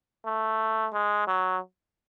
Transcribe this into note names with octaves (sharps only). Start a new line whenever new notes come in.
A3
G#3
F#3